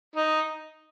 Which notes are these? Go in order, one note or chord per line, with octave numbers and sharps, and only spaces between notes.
D#4